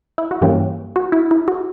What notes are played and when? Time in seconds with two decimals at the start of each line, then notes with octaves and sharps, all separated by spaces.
0.18 E4
0.31 F#4
0.42 G2 E3 A#3 C#4 G4
0.96 F#4
1.12 E4
1.31 E4
1.48 F#4